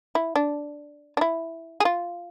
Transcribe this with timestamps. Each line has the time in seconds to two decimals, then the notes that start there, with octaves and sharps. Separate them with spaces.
0.15 E4
0.36 D4
1.17 D4
1.21 E4
1.80 G#4
1.85 F4